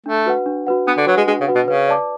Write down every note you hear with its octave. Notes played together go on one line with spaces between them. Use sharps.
A3 D4
F#4 B4 F#5
D4
F#4 B4 F#5
B3 D4
D3
F#3 F#4 B4 F#5
G#3
G#3 D4
C#3
F#4 B4 F#5
B2
C#3 B4
D5 A5 D6